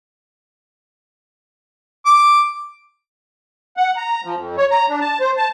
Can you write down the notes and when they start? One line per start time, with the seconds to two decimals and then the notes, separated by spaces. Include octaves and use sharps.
2.06 D6
3.77 F#5
3.97 A#5
4.25 F3
4.36 F2
4.57 C#5
4.71 A#5
4.89 D4
5.01 A5
5.21 C5
5.37 A5